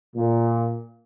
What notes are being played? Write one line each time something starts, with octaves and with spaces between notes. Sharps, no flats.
A#2